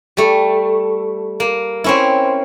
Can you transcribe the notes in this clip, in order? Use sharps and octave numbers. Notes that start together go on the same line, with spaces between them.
G3 A3
A#3
C4 C#4 E4